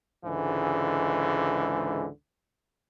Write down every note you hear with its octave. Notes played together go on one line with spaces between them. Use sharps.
C#2 G#2 D3 E3